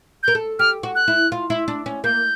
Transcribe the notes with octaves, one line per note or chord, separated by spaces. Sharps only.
A#4 G6
A4
G4 F6
F#4
F#6
E4
F4
E4
D4
C#4
A#3 G6